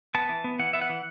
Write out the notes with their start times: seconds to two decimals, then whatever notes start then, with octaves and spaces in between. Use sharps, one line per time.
0.15 B3 A5
0.29 E3
0.44 B3
0.59 E3 F#5
0.73 B3 E5
0.81 F#5
0.90 E3